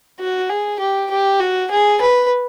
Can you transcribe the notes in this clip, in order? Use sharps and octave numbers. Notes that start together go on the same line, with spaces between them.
F#4
G#4
G4
G4
F#4
G#4
B4